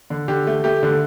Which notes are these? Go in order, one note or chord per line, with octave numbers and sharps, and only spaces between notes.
D3
D3 G4
A3
A3 G4
D3